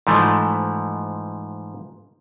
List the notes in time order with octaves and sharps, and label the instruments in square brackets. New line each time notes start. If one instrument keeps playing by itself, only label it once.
[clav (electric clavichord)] G#2 E3 F3 A3